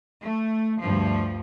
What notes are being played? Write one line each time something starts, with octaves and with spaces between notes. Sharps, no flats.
A3
D2 G2 F3